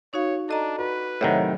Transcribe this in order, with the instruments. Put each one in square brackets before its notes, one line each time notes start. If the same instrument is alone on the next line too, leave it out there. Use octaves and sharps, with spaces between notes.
[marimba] D#4 F#4 F5 [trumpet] C#5
[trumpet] D4 [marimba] A4 D#5 A#5
[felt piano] F#4 [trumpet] B4
[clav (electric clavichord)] A2 C3 D#3 [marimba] F#3 E5 [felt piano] C#5 F#5 A#5